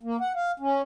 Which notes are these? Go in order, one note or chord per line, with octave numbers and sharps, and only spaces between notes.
A#3
F#5
F5
C#4